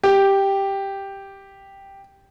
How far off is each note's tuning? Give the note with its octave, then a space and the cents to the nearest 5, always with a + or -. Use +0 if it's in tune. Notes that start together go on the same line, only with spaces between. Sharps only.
G4 +0